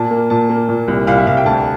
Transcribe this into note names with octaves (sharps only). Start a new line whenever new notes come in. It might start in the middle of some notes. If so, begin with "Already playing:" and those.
Already playing: A#2 A5
A#3
A#2 A5
A#3
A#2
C2
C2 F5
E5
C2 F5
G5
D2 A5